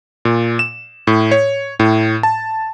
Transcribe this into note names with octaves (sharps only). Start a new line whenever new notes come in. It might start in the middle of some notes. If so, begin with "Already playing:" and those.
A#2
E7
A2
C#5
A2
A5